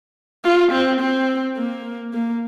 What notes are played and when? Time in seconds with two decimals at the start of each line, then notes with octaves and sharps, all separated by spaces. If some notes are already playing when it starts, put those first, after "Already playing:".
0.44 F4
0.72 C4
1.00 C4
1.57 A#3
2.13 A#3